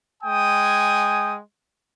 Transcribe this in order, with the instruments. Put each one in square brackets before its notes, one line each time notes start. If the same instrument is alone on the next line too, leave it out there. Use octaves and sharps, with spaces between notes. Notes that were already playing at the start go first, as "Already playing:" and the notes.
[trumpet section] G#3 G5 G#5 D#6